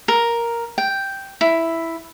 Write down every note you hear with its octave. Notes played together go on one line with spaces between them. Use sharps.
A#4
G5
E4